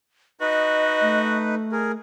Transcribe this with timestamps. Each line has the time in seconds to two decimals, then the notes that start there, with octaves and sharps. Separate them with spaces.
0.41 D#4 F#4 B4 D#5
1.01 A3
1.72 G#4 A#4